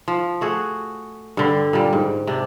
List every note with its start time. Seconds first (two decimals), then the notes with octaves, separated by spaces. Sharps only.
0.08 F3
0.41 A3 F#4 G#4
1.37 G2 D3 G3
1.73 A#2 G3
1.93 G#2
2.27 C3 D4